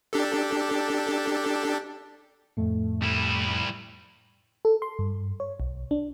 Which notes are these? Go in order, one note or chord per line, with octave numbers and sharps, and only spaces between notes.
D4 G4 A4
F2 A2 A3
G3 E4
A4
C6
G2
C#5
B1
D4